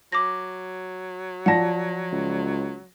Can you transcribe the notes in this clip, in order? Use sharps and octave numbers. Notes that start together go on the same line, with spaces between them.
F#3 D6 A#6
F3 D5 F#5 A5 A#6
C#2